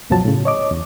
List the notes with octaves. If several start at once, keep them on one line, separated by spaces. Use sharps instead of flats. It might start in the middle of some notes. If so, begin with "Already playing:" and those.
C#2 F#2 B2 F3 F#3 A5
A2 C#3
C#5 D#5 D6
E2